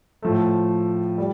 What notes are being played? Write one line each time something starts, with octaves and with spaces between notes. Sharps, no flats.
A2 F3 A3
G3